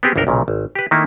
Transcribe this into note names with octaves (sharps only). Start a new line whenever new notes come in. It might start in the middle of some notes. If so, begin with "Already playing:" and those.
B3 C4 G4 G#4
G1 C2 D4 A4 A#4 G5
B1 A#2 C#3
G#1
G4 B4
D#3 A3 A#3 D#4 E4